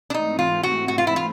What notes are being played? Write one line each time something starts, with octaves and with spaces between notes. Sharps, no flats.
D4
G#2 E3 A3 C4 D#4
F4
F#4
F#4
F4
E4
F4